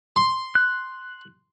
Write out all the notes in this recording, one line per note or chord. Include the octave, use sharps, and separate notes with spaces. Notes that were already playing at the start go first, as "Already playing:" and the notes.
C6
F#6